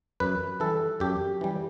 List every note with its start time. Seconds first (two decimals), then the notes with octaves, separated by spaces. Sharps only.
0.20 F#2 B4
0.60 E3 G3 A4
1.00 F#2 G4
1.41 E3 G3